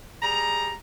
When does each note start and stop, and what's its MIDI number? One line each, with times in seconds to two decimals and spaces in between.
0.22 0.73 55
0.22 0.73 68
0.22 0.73 82